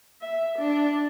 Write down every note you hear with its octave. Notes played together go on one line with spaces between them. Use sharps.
E5
D4